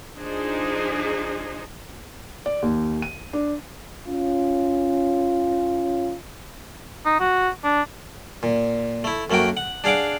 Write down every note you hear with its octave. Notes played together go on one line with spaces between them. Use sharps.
F3 D4 D#4 G#4 C5
D5
D#2
D#7
D4
C#4 F4
D#4
F#4
D4
A#2
A3 E4
F#2 A3 A#3 F#4 G5
F#5
D4 G#4 F5 F#5 D6